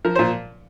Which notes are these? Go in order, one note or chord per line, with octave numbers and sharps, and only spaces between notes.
F3 A#4
A#2 C5